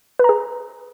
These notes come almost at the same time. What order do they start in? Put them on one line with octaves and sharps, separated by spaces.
B4 A#5 G#4